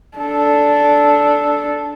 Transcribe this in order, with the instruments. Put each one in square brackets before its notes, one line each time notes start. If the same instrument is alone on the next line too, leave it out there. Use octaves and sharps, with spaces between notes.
[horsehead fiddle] D4 A4